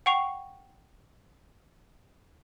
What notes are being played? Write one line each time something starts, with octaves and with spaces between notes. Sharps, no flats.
F#5 G5 C#6 C7 F7